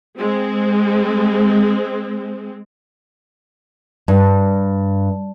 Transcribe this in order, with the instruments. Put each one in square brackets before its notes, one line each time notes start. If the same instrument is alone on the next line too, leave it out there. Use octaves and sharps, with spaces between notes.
[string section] G#3 C4
[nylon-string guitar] G2